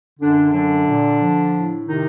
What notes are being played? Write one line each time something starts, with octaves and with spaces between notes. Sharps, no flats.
F#2 D3 D4
D3 F#3 D4
A#2
F3
A2
C3 D#3 D#4